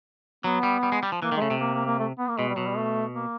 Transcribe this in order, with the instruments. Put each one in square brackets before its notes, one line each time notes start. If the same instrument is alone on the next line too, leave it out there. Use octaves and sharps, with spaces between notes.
[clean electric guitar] F#3 [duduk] B3
[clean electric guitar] G3
G3
G#3
G3
F3
[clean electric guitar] E3 [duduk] A#3
[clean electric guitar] D#3
[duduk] G#3
[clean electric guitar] C#3 [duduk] A3
[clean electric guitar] C3
[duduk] A#3
A#3
A#3
A3
B3
A#3
[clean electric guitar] B2 [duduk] G#3
[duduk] G3
[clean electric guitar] B2 [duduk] F#3
[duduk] G3
A3
A#3